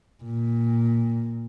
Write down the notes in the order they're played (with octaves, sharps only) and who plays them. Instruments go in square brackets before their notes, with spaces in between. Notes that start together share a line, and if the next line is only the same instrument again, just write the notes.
[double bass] A#2